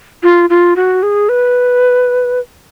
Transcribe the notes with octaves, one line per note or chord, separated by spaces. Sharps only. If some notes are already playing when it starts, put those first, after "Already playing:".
F4
F4
F#4
G#4
B4